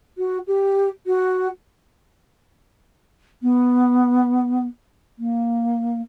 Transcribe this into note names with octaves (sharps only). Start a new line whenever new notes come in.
F#4
G4
F#4
B3
A#3